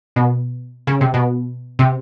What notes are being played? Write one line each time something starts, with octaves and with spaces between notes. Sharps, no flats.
B2
C#3
C3
B2
C3